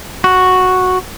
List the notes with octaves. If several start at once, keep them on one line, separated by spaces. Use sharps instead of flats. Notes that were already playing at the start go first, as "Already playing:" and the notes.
F#4